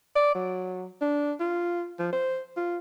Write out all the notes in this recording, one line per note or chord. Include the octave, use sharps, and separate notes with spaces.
D5
F#3
D4
F4
F3
C5
F4